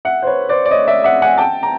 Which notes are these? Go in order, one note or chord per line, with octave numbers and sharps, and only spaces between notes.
E5 F#5
C5
B4 C#5
C5 D5
D5
C#5 D#5
D5 E5
E5 F#5
F#5 G#5
G5 A5
A#5